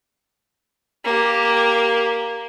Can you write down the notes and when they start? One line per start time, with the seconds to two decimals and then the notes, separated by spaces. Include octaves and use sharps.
1.04 A#3 G4